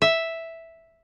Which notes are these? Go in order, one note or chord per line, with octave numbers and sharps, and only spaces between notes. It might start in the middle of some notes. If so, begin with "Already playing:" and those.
E5